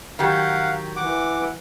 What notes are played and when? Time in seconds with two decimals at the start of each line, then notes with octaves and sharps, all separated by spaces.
0.19 D#3 F#3 G4 F5 F#5
0.96 E3 F#5 D6